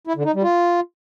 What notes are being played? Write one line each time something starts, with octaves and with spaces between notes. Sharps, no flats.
E4
D3
D#4
G3
F4